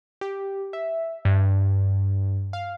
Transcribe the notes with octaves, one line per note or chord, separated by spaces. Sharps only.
G4
E5
G2
F5